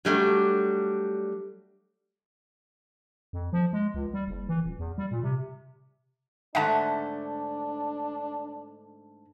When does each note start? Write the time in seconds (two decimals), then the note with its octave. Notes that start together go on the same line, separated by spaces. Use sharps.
0.05 F#3 G3 A3 D4
3.33 F2
3.53 F3
3.73 G#3
3.94 C#2
4.14 G3
4.28 F#1
4.49 E3
4.62 D#1
4.79 E2
4.98 G3
5.11 A#2
5.23 C3
6.55 G#2 D3 A3 D4 E5 F#5 A5